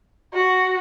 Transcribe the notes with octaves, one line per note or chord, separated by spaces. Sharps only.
F#4